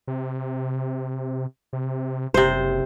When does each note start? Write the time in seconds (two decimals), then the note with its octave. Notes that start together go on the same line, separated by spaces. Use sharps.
0.07 C3
1.73 C3
2.34 F#1 C3 C5